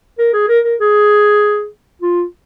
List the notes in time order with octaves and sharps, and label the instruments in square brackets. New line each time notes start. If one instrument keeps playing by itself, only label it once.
[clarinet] A#4
G#4
A#4
A#4
G#4
F4